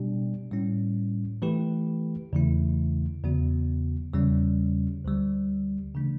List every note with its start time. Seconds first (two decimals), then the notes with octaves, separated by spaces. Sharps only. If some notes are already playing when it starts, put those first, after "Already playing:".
Already playing: B2 G3 D4 G4 D5
0.51 A2 G3 C#4 E4
1.42 E3 A3 E4 G4 B4
2.33 E2 C#3 E3 A3 E4
3.23 E2 C#3 F#3 B3 F#4
4.14 E2 C#3 G3 C#4
5.04 D2 D3 G3
5.95 C#3 E3 A3 D4